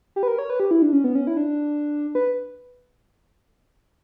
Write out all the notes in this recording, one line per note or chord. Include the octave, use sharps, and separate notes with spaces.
G4
B4
A#4
C#5
B4
G4
E4
D4
C#4
B3
C#4
E4
D4
B4